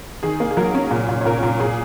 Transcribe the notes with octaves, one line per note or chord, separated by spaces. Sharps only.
D#3 G#4
A#3
G#4
F#3 A#4
C#4
A#2
A#2
C#5
A#2 A#4
A#2
A#2 G#4